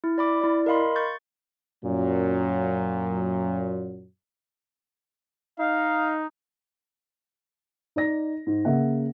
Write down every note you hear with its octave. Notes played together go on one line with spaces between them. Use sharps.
E4
D5 B5 D6
E4 D5
A#4 D#5 F5 B5 C6
C#6 G6 A6
F#2 A#2 F#3
D#4 F5
D#4 D5 A#6
G#2
C#3 A#3 E5 F#5